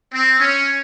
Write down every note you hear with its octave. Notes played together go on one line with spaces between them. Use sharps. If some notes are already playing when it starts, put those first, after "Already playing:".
C4
C#4